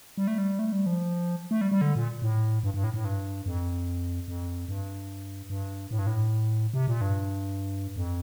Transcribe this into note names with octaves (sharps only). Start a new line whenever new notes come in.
G3
A3
G3
A3
G3
F3
A3
G3
G3
D3
A#2
A2
G2
G2
A2
A2
G2
F2
F2
G2
G2
A2
G2
A2
C3
A#2
G2
F2